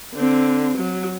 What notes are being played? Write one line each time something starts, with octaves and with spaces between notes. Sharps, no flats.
D3 C4
F#3